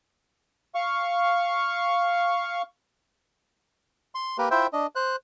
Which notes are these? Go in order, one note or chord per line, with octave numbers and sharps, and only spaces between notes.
F5 C#6
C6
A#3 G4 A#4 B4
E4 F4 C5 E5 G5
D4 D#5
C5 F#6